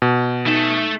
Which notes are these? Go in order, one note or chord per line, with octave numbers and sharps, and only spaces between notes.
B2
A3 D#4 A4 E7